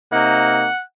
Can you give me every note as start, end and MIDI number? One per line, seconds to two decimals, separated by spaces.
0.13 0.68 48
0.13 0.68 58
0.13 0.68 63
0.13 0.80 78